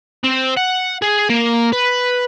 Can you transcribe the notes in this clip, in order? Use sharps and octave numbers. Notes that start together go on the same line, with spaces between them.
C4
F#5
G#4
A#3
B4